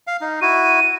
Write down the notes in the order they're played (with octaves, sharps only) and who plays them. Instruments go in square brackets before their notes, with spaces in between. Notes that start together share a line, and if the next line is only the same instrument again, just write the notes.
[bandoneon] F5
D#4
[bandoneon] E4 F#4 [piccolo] D#7